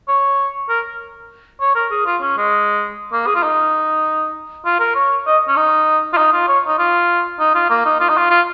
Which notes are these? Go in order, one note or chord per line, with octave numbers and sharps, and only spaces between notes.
C#5
A#4
C#5
A#4
G#4
F4
C#4
G#3
A#3
G#4
F4
D#4
F4
A#4
C#5
D#5
C#4
D#4
F4
D#4
F4
C#5
D#4
F4
D#4
F4
A#3
D#4
F4
D#4
F4
F4